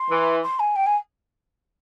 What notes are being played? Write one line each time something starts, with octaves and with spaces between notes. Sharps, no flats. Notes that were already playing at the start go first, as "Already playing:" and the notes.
Already playing: C6
E3
C6
G#5
G5
G#5